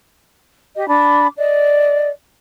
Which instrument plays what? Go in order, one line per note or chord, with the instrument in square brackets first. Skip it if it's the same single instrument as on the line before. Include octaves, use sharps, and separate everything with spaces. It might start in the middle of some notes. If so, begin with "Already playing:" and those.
[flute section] G4 D#5
D4 B5 D6
D5 D#5